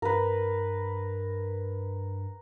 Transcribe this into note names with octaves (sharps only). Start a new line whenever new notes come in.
G2 A#4 B4